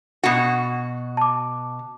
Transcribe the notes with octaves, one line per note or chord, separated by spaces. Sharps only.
B2 F#4
A5 D6